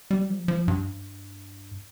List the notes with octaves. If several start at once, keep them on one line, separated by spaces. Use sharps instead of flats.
G3
F3
F3
G2